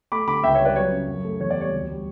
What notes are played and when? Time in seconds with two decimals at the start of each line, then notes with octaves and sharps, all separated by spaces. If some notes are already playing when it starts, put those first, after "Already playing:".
0.12 A3 B5 D6
0.27 D3 B5 D6
0.44 C#2 E5 G5
0.55 C#5 E5
0.60 G3
0.65 B4 D5
0.76 F#3 C#5
0.92 C#3
1.07 F#2
1.25 A3
1.40 E2 C#5
1.51 D5
1.56 G3
1.61 C#5
1.72 D2
1.88 G3